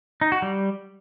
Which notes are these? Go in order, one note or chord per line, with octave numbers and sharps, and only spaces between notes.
D#4
F#4
G3